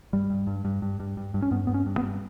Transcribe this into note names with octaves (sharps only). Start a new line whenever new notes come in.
G2 G3
G2
G2
G2
G2
G2
G2
G2
C#4
G2 B3
G2 B3
C#4
G2
B3
G2